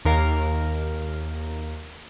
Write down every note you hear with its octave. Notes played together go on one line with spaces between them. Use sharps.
D#2 A#4 F5